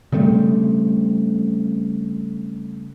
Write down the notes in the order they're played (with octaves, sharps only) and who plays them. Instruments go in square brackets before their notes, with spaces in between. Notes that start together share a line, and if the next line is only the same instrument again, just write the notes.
[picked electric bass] C#3 G3 A3 C4